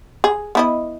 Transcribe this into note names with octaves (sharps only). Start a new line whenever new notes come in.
G#4
B3 E4 D#5